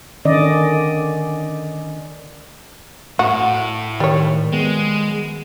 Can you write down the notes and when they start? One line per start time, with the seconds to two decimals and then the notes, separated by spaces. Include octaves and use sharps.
0.25 D3 D#3 C#4 D5 D#5
3.19 A2 F#4
4.00 D#3 G3 C#5
4.53 G#3 B3